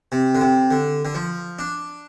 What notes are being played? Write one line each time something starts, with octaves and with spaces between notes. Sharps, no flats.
C3
D3
C3
D3
D3
F3
D4